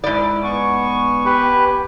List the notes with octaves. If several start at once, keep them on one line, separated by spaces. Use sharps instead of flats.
G#2 E4 D5
B3 G#5 C#6
G4 B4